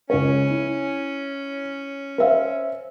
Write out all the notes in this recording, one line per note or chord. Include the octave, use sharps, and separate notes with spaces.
C#2 C#4 C#5
E4
C5 E5 F5